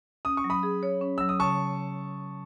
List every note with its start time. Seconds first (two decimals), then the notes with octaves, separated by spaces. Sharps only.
0.25 C#4 D#6
0.37 C#6
0.44 F#3
0.50 B5 D#6
0.63 G#4
0.83 C#5
1.01 C#4
1.18 F#3 E6
1.29 D#6
1.40 C#3 A5 C#6